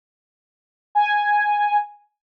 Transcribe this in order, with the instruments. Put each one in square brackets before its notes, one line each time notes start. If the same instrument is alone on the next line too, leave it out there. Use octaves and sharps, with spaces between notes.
[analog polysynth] G#5